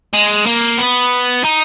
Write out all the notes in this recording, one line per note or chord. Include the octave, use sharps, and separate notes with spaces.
G#3
A#3
B3
D#4